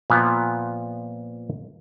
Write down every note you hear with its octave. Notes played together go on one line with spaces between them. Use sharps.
A#2 F3 B3